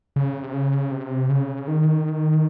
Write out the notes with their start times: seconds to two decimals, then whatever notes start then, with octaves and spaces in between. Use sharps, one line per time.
0.16 C#3
0.43 C3
0.53 C#3
0.92 C3
1.29 C#3
1.68 D#3